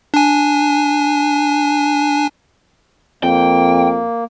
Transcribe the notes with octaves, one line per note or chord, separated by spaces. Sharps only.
D4 G#5
F2 A#3 G5